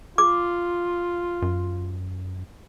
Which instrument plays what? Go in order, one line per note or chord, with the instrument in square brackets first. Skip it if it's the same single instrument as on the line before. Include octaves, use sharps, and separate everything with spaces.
[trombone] F4 [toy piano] D6
[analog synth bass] F#2